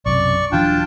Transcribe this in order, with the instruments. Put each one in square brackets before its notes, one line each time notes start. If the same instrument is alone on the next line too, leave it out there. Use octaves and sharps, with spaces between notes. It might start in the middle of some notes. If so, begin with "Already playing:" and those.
[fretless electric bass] B1 F#2 C3 [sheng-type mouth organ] D5 C#6
[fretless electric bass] D#1 E3 F#3 [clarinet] D4 [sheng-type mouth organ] F4 G5 A5